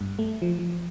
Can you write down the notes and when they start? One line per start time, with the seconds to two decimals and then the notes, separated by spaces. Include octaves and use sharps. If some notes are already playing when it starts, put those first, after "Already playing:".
0.01 G2
0.19 A3
0.42 F3
0.59 F3